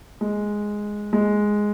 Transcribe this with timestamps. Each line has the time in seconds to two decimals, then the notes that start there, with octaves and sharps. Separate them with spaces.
0.21 G#3
1.13 G#3